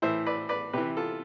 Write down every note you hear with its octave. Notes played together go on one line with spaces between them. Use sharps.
A2 E3 C5 E5
B4 D5
B4 D5
C3 E3 G4 B4
F4 A4